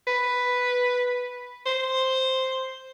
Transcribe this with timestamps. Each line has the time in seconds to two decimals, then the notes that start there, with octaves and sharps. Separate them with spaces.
0.07 B4
1.66 C5